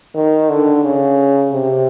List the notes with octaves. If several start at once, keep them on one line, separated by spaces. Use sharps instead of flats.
D#3
D3
C#3
C3